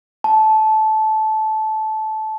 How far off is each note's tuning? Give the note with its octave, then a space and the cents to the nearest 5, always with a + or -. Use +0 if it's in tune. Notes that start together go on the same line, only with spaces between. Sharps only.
A5 -15